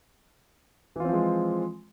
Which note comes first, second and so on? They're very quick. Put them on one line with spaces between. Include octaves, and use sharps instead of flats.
E3 F4 C4 F3 G#3